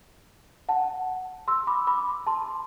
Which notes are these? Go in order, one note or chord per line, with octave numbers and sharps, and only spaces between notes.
F#5 A5
C6 E6
B5 D6
B5 D6
A5 C6